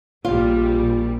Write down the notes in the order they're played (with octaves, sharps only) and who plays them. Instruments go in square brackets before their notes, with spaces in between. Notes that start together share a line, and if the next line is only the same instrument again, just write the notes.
[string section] A#1 G3 [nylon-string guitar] F4